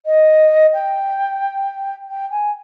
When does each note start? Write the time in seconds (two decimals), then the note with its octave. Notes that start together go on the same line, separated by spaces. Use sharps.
0.06 D#5
0.73 G5
2.08 G5
2.31 G#5